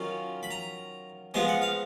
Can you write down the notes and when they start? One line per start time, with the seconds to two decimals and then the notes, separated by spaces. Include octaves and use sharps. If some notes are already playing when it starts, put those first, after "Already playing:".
Already playing: D#3 F#3 C#4 F4
0.43 B5
0.51 A#5
1.34 F3 G#3 B3 F4 G#5
1.48 F#5
1.62 F5